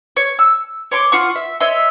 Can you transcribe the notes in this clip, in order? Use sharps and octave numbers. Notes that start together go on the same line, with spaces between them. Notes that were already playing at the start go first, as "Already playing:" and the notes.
C#5
E6
C#5 C6 D6
F4 F#5 C#6
E5
C#5 D#5 E5 C6